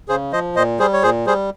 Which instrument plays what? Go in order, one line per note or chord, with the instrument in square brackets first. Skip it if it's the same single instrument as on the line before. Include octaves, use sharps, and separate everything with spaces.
[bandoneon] C#3 G#4 C5
F3 C5 D#5
A#2 C5 D#5
G3 G#4 C5
C#5
A#2 G#4 C5
G3 G#4 C5